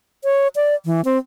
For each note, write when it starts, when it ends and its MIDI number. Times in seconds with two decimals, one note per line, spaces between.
0.24 0.48 73
0.56 0.75 74
0.85 1.01 52
1.05 1.18 60